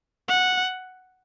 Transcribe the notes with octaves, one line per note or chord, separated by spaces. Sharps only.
F#5